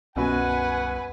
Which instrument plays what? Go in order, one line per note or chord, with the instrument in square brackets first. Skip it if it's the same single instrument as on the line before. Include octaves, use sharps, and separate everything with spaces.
[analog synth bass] C2 [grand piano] F#2 B2 F#4 [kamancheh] B4 G#5 [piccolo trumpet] F#5